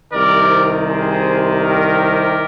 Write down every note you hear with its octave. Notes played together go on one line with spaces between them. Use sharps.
C2 C3 D#3 A#4 D5
G#4 C5
G4 A#4